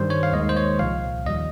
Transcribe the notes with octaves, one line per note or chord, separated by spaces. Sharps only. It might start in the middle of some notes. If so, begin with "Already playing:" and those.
Already playing: G2 D#3 G3 C5
C#5
F5
D#2 D#3 G#3 D#5
C5
C#5
C2 A#2 F3 F5
D#2 D#3 G3 D#5